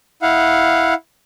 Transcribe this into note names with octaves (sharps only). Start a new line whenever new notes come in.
E4 F5 F#5